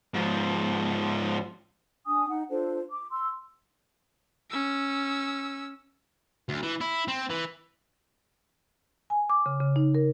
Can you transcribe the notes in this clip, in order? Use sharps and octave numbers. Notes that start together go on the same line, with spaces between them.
G#2 F3
D4 G#5 D#6
D#4 F#5
D4 F4 A4 C5
D6
C6 E6
C#4 E6
D2
E3
E4
C4
E3
G#5
D6
C#3
C#3
D#4
A#4